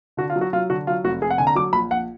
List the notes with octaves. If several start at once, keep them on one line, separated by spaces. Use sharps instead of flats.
D3 F#4
F4
F#3
F#4
F#3 F4
D3 F#4
F#3 F4
F1 F#4
F1 G#4
F#5
D3 G#5
A#5
F#3 D6
A#1 B5
A#1 F#5